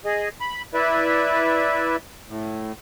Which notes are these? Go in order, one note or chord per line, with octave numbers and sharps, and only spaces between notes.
G#4 D#5
B5
E4 B4 D5 E5
A2